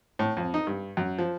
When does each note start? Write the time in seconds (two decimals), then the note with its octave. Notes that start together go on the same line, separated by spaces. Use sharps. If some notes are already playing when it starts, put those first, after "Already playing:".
0.19 A2
0.37 F2
0.54 D#4
0.67 G2
0.97 F#2
1.18 F3